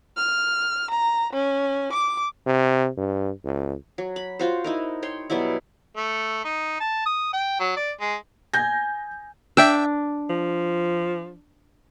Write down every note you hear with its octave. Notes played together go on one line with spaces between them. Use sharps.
F6
A#5
C#4
D6
C3
G2
C#2
F#3
B5
F4 F#4 C5
D#4 E4 A#4
C#5 G5 C6
B2 F#3 G3 E4
A3
D#4
A5
D#6
G5
F#3
D5
G#3
G#5 G6 A#6
D4 E5 G5 E6
F3